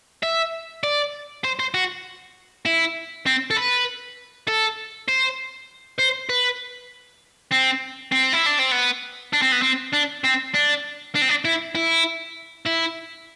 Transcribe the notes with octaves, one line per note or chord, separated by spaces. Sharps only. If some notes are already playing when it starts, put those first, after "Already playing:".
E5
D5
C5
C5
F#4
E4
C4
A4
B4
A4
C5
C5
B4
C4
C4
E4
D4
C4
B3
D4
C4
B3
C4
D4
C4
D4
D4
C4
D4
E4
E4
E4